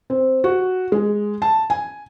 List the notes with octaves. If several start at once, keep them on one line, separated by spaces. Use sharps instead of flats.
C4
F#4
G#3
A5
G#5